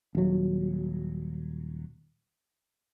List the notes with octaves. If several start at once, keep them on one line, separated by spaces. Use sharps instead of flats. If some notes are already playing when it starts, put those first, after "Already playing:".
D#1 F#3